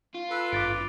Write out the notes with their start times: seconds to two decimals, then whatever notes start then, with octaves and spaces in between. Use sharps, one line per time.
0.15 F4
0.31 A4 B4 E6
0.52 G#1 G2 D6 A6 D7